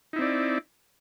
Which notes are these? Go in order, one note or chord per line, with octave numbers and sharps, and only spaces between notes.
C4 D#4 E4 D5